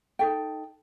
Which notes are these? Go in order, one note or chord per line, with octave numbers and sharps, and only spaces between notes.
D#4 A4 G5